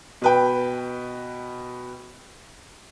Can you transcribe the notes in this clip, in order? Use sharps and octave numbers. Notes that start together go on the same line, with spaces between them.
B2 B4 G5